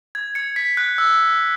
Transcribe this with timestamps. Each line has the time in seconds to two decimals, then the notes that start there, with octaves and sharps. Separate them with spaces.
0.15 G#6
0.35 G#6 C#7
0.56 B6
0.77 F#6
0.98 E6